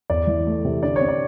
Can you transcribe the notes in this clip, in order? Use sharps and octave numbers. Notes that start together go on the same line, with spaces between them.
E2 D5
E3
A3
C3
D3 D5
C#5
C4
D5